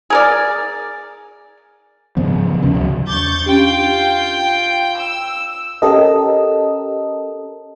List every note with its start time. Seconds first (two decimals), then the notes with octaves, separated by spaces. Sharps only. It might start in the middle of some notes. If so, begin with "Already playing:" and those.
0.10 G#4 A#4 D5
2.17 G#2 C#3 F3 B3
2.50 C#3 E3
2.62 D#2 C3 C#4
2.74 C#2 F#3
3.07 E2 C#6 D6 G6 A6
3.46 C#4 D4 F4 G4 G5
4.97 E6
5.82 C#4 G4 A4 A#4 D#5